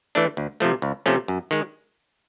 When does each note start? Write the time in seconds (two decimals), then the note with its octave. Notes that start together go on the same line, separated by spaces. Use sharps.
0.15 E3 A3 D4
0.37 D2
0.60 C3 F3 A3
0.82 C#2
1.06 C3 F3 A3 C#4
1.28 F#2
1.51 D#3 G#3